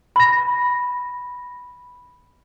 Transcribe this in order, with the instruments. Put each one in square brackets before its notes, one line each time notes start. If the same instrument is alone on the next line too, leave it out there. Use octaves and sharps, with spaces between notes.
[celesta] B5 A#6